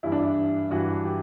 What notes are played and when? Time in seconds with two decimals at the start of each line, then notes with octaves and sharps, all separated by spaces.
0.03 G2 E3 E4
0.12 D4
0.22 E4
0.70 G2 E3 F#4
1.05 G4